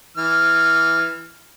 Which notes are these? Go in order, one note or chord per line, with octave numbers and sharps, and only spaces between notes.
E3 F6